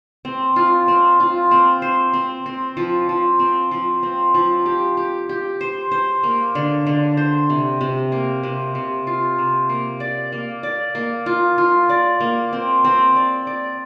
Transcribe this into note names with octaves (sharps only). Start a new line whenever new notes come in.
C4
F4
C4
F4
C4
C5
C4
C4
F3
F3
C4
F3
C4
F3
G4
G4
G4
C5
C5
A#3
D3
D3
C5
C3
C3
A#3
C3
C3
F4
C3
A#3
D5
A#3
D5
A#3
F4
F4
D5
A#3
C4
C4
D5
D5